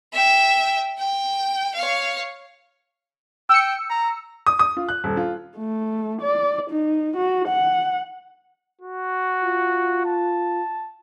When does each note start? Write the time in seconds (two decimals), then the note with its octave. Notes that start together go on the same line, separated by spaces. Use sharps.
0.13 E5 G5
0.98 G5
1.74 C#5 F5
3.49 G5 E6 C#7
3.90 A#5
4.47 D#6
4.59 D#6
4.77 F4
4.89 F#6
5.04 D#1
5.17 F4
5.57 A3
6.22 D5
6.70 D#4
7.17 F#4
7.48 F#5
8.82 F#4
9.44 F4
10.06 A5